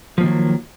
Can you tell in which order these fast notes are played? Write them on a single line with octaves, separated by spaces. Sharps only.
F3 A#3 D#3 F#3